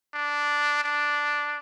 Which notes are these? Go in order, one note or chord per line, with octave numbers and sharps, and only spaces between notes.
D4
D4